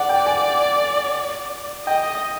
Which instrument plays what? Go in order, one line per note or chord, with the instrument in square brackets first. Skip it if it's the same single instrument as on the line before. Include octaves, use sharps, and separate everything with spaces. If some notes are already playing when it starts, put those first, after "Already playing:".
Already playing: [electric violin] D5 [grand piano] F#5
[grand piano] G5
G#5
[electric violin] D#5 [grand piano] G5